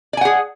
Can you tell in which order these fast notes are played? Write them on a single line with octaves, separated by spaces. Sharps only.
D5 G#5 F#5 G#4